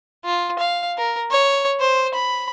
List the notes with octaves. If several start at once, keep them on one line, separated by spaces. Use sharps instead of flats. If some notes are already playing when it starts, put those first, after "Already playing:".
F4
F5
A#4
C#5
C5
B5